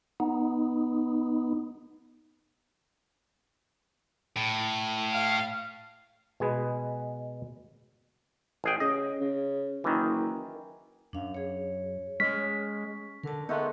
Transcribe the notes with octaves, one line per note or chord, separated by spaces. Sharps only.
B3 D#4
A2
F5
B2 G#3 G#4 B4
A1 G#4 G5
C#3 D#5
C#3
F#1 D#3 E3
F#2 D4 F5
G#4 C#5
G#3 C#4 B6
D3 A#4 A5
G#3 A3 B3 D#4